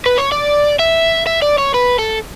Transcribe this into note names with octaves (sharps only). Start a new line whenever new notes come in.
B4
C#5
D5
E5
E5
D5
C#5
B4
A4